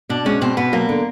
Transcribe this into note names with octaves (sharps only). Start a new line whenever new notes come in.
B2 D4
G#3 C#4
B2 C4
B2 B3
F#3 A#3
D3